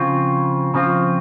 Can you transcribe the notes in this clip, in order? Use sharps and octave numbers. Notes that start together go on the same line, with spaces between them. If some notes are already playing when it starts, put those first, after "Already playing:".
Already playing: C#3 F3 C4 F4
C#3 F3 C4 F4